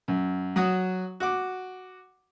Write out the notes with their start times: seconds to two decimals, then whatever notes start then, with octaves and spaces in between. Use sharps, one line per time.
0.08 F#2
0.56 F#3 F#4 D#6
1.20 F#4 D6